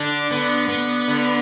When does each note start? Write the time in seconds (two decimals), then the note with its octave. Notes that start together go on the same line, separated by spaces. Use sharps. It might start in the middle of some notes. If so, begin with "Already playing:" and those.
Already playing: D3 D4
0.31 D3 B3
0.69 B3
1.08 D3